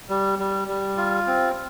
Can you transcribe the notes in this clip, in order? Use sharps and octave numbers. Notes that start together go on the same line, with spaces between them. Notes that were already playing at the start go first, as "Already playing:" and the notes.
G3
G3
G3
F4
C4